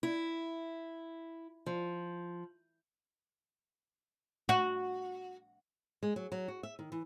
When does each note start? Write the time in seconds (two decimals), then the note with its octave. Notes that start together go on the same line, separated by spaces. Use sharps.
0.03 E4
1.66 F3
4.49 F#4
6.03 G#3
6.16 F#3
6.32 F#3
6.48 F#4
6.63 E5
6.79 D#3
6.92 E3